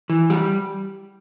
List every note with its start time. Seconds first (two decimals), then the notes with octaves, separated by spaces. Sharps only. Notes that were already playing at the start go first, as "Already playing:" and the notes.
0.10 E3
0.30 G3